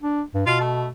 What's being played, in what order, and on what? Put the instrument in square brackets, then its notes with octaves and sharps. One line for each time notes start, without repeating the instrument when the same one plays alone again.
[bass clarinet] D4
G2
[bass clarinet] B2 [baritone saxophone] F4
[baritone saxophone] A3